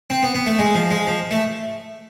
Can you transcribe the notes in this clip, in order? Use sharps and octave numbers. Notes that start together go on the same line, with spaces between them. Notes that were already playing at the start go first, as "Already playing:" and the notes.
C4
B3
B3
A3
G#3
F3
G#3
F3
A3